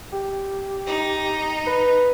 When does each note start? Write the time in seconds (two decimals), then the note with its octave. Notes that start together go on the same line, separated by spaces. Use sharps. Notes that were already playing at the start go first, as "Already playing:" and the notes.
0.13 G4
0.87 D#4
1.67 B4